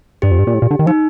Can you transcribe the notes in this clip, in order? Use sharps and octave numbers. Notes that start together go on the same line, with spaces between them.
G2 G4
F2
G2
A#2
A2
A#2
D3
D#3
F3 D#4